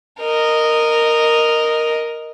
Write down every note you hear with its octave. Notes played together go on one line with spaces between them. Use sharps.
A#4 D#5